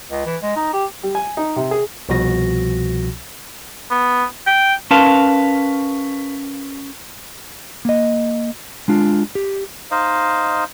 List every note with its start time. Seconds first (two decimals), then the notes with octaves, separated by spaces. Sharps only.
0.11 C#2
0.26 E3
0.43 G#3
0.56 D#4
0.73 G4
1.03 G3
1.15 G#5
1.37 D#4
1.56 C3
1.71 G#4
2.09 C2 B2 F3 F#4 A#6
3.91 B3
4.47 G5
4.91 C#4 A#4 B4 F5 A5 C6
7.85 A#3 D#5
8.88 G#3 D4 F4
9.35 G4
9.91 D#4 C5 D#5 F5